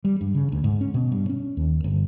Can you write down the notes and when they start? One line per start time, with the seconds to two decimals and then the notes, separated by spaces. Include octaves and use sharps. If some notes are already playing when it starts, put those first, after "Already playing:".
0.05 G3
0.21 G2
0.35 C#3
0.52 D2
0.64 G#2
0.81 C#4
0.94 B2
1.12 G2
1.30 C#4
1.57 D#2
1.84 G1